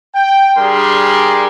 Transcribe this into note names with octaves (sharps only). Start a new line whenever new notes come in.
G5
G3 D4 G#4 A#4 C6